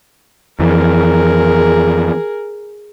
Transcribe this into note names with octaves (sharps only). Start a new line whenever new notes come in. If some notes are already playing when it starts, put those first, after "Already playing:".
F2 E3 G#4 A#4